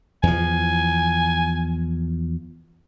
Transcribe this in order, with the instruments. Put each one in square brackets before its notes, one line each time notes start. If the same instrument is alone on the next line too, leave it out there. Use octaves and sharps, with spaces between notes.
[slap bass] E2 F3 [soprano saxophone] G#5